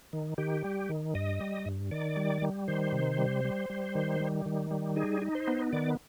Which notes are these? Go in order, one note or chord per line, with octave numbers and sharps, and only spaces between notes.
D#3
D#3 G4
G3
D#3
G2 D#5
G3
G2
D#3 D5
G3
G3
D#3 C5
C3
G3
G3
G3
D#3
G3
D#3
G3
D#4 G#4
D#4
C5
B3
D#3 D5